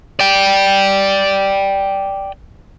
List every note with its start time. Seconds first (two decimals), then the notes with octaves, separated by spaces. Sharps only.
0.20 D5 G5